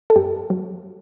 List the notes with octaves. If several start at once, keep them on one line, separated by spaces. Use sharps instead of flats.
A4
F#2 G4
F#3